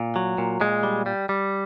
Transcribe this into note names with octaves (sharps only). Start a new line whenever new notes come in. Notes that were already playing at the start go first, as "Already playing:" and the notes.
Already playing: A#2
F#3
A#2
A#2 G#3
G3
G3
G3